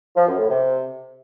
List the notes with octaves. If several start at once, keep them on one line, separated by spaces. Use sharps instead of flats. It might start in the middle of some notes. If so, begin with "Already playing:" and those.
F3
F#2
A2
C3